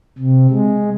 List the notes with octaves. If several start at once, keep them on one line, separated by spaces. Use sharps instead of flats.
C3
G#3